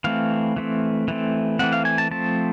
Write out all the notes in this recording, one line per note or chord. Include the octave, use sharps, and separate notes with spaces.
E3 A3 C4 F5
E3 A3 C4
E3 A3 C4
E3 A3 C4 F#5
F5
G#5
A5
F3 A3 C4 A5